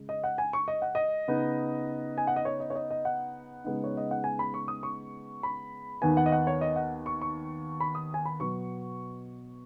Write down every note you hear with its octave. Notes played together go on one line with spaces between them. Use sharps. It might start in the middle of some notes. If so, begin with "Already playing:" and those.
Already playing: C#3 G#3
D#5
F#5
G#5
C#6
D#5
F#5
D#5
C#3 B3 D#4
G#5
F#5
D#5
C#5
D#5
C#5
D#5
D#5
F#5
C#3 G#3 B3 D#4
C#5
D#5
F#5
G#5
B5
C#6
D#6
C#6
B5
D#2 D#3 B3 G#5
F#5
D#5
F#5
C#5
D#5
F#5
C#6
C#6
B5
D#6
G#5
B5
B2 F#3 B3 C#6